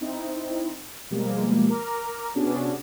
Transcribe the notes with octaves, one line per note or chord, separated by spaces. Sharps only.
C4 D#4 E4
B2 F3 G3 G#3 A#3
A#4 A#5 D6 F6
C3 B3 C#4 D4 F#4 G#4